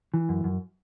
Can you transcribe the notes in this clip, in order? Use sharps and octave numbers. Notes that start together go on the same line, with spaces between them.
E3
F#2
F#2